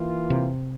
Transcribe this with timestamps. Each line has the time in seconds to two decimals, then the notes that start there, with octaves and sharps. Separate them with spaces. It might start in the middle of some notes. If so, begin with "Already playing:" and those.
Already playing: E3 A#3 F4
0.30 C3